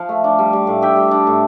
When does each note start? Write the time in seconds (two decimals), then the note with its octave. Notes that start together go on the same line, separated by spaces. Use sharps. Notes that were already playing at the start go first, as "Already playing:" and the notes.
Already playing: F3 F5 A5
0.09 A3
0.24 D4
0.39 G3
0.53 G3
0.67 A2
0.82 D4 E5 G5
0.97 G3
1.11 D4
1.27 A2